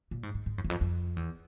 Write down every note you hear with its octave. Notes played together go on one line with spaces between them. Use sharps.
A#2
G#2
G#2
G#2
F#2
E2
F2
F2
E2